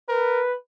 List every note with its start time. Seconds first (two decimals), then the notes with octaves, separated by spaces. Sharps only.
0.08 A#4 B4